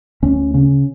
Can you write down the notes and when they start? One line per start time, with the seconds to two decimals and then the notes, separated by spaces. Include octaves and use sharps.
0.22 D2 C#4
0.54 C#3 C#4